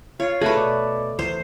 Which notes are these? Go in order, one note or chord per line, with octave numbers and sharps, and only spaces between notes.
F4 C#5
A3 E4 F#4 G#4 B4
B2 D5
E2 C5